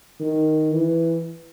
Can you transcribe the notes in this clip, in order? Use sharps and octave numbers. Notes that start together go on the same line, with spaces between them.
D#3
E3